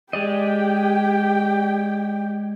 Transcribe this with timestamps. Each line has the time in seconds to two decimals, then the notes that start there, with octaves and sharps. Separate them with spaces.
0.13 G#3 G4 D5 D#5 G5